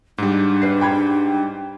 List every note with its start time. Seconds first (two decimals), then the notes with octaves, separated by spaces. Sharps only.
0.18 G#2 G3 D4
0.62 B4 C7
0.81 G5 B5 G#6